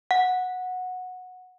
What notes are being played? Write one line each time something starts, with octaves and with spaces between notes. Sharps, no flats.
F#5